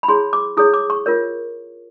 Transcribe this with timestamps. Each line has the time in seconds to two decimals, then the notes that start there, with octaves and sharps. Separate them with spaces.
0.03 B5
0.08 E4 G#4 C#5 C6
0.33 D6
0.57 E4 G#4 C#5 D#6
0.74 D6
0.90 C#6
1.06 F4 A#4 C#5